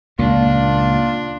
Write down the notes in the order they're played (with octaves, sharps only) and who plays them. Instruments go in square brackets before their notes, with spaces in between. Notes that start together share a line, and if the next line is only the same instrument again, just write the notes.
[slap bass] C#2 A#2 [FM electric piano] A#3 [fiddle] D4 [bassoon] F4